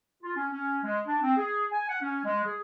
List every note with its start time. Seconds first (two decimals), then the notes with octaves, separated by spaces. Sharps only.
0.23 F4
0.36 C#4
0.52 C#4
0.84 G#3
1.07 D4
1.22 C4
1.37 G#4
1.72 G#5
1.89 F#5
2.01 C#4
2.25 G#3
2.45 G#4